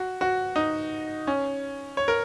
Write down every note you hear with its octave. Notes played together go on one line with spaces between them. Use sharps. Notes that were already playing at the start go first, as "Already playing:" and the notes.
Already playing: F#4
F#4
D#4
C#4
C#5
A#4